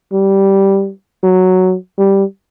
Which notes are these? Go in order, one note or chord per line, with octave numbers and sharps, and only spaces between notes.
G3
F#3
G3